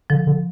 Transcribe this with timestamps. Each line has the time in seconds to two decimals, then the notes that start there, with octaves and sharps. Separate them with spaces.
0.10 D3 F3
0.27 D3